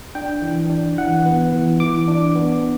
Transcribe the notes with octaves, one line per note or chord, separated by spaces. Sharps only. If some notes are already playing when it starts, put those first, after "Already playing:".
D4 G5
E3
D4
E3 F#5
B3
E3
E3 D6
D4
B3